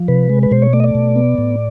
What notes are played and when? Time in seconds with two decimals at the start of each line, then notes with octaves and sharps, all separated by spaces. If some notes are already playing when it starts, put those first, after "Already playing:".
Already playing: F3
0.08 C3 B4
0.29 G#3
0.43 B4
0.51 B2 C5
0.62 C#5
0.73 A3 D5
0.80 D#5
0.84 D5
0.95 B2
1.16 B3
1.38 A2